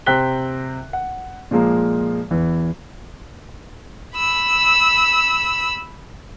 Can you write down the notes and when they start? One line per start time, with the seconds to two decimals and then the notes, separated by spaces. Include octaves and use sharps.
0.06 C3 C5 G5 F#6 B6 G7
0.93 F#5
1.51 A#2 F3 G#3 A#3
2.31 E2 E3
4.17 B5 E6